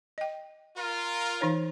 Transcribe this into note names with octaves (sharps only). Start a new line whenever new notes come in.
D#5 G5
F4 A#4
E3 D#4 C#5